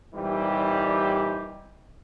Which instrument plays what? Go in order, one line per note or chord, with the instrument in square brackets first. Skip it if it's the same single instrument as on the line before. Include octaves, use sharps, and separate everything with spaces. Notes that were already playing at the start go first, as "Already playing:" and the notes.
[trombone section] A#2 E3 G3 C4 D#4 G4